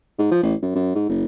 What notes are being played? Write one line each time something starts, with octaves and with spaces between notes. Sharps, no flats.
G#2
F3
A1
F#2
F#2
G#2
F#1